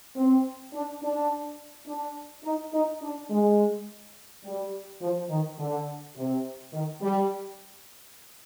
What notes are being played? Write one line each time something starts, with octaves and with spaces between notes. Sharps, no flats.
C4
D4
D4
D4
D#4
D#4
D4
G#3
G3
F3
D#3
D3
C3
D#3
G3